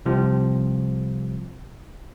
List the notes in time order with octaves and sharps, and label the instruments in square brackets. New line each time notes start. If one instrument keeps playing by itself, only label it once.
[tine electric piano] C2 C3 F3